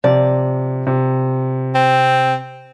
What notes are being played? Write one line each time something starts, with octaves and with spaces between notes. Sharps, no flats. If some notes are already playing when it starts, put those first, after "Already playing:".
C3 F3 D5
C3
C4